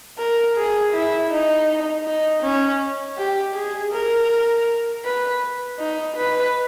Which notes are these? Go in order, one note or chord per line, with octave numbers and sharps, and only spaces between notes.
A#4
G#4
E4
D#4
D#4
C#4
G4
G#4
A#4
B4
D#4
B4